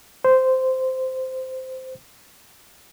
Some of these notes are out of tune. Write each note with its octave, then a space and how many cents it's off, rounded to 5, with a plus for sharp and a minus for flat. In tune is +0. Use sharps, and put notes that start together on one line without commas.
C5 -10